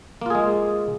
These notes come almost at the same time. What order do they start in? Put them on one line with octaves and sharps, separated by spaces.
A#3 F4 G#4 G#3